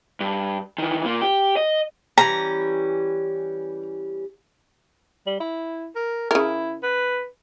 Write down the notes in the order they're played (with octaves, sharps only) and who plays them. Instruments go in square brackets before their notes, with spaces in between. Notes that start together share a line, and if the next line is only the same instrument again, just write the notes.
[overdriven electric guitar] G2
D#3 E3
A#2 A#3
G4
D#5
[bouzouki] E3 G3 C#4 [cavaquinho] A#5
[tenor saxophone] G3
E4
A#4
[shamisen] C#3 A#4 [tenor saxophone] E4
[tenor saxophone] B4